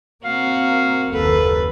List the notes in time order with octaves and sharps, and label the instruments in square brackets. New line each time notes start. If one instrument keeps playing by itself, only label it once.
[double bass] A#3 C4 [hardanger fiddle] F#4 [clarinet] F5
[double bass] F#1 D#2 [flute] A4 [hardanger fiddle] B4